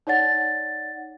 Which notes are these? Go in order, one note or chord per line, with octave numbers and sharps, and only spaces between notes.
D#4 C#5 D5 F#5 A6